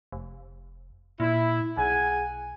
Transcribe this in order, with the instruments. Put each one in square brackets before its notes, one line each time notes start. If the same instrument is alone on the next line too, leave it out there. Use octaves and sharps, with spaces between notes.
[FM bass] F1
[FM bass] A#2 [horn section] E4
[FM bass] B1 [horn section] G#4 F#5 G#5